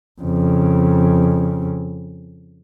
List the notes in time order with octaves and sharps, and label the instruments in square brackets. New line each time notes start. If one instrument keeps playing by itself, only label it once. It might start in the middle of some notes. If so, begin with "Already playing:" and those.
[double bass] F2 C#3